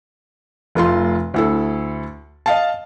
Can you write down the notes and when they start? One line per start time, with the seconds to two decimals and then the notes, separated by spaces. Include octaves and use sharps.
0.75 F1 A3 F4 C6
1.34 D2 E4 A4
2.46 D#5 F5 A5